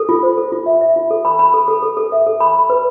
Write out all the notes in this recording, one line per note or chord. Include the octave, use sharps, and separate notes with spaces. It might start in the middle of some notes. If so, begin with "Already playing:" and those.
Already playing: A4
F4
C5
A4
F4
E5
E5
F4
A4
B5
B5
A4
A4
A4
A4
E5
A4
B5
B5
B4